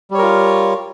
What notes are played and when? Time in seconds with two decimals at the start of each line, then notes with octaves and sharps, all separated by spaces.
0.11 G3
0.14 C#5
0.18 A#4
0.22 F4